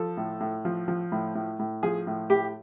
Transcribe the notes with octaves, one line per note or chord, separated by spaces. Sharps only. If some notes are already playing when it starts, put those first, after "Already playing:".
Already playing: F3 A4
A2
A2
F3
F3
A2
A2
A2
F3 G#4
A2
A2 G4